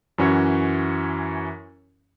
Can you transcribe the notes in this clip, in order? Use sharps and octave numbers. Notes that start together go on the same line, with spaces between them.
F#2 E3 C#4 F#4 C#5